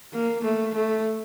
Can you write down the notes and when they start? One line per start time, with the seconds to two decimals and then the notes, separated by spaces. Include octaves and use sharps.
0.13 A#3
0.43 A3
0.74 A3